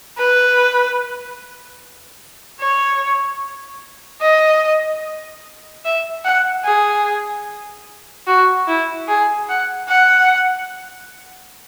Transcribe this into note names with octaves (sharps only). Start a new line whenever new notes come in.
B4
C#5
D#5
E5
F#5
G#4
F#4
E4
G#4
F#5
F#5